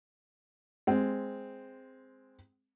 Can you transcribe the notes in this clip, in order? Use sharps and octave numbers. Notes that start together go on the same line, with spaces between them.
G#3 C4